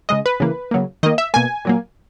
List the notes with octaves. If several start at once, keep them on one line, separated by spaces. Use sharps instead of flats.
C#3 G#3 D#5
B4
C#3 E3 A#3
C#3 F#3 A#3
D#3 A#3 D#5
E5
B2 A#3 G#5
A#2 F#3 A#3